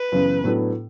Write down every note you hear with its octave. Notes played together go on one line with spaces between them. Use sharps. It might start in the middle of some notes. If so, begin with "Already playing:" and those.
Already playing: B4
F#2 C#3 E3 B3
A2 F#3 B3 D4 A4